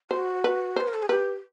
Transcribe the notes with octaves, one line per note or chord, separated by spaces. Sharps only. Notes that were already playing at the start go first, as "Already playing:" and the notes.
F#4 C5
B4
B4 C5
A#4
A4
G#4
G4 B4